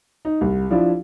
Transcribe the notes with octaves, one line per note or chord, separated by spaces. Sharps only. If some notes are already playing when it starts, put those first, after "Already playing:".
D#4
C2
F3 D4 E4 F4